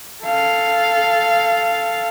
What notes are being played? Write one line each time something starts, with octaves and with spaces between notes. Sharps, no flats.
A4 F5